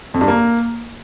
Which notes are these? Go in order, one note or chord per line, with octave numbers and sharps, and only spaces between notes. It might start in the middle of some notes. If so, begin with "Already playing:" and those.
F2
G2
A#3